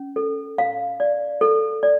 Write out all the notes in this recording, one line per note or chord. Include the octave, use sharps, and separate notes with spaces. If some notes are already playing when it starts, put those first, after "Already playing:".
Already playing: C#4
A4
F5
D5
A4
D5